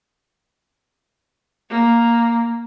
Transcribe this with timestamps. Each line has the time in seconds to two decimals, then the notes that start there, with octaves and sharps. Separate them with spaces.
1.70 A#3